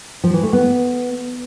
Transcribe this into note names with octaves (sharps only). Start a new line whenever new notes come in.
F3
E3
A3
B3